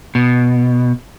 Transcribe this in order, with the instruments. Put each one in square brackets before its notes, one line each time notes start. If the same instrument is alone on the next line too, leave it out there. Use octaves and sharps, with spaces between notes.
[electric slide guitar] B2